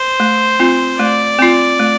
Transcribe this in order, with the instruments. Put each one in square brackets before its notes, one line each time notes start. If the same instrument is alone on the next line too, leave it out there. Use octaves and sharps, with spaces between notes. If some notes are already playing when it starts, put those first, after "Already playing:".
Already playing: [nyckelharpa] C5
[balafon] A3
C4 F4
[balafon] A3 [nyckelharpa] D5
[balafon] C4 F4
A3